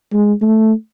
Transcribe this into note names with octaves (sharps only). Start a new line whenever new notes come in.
G#3
A3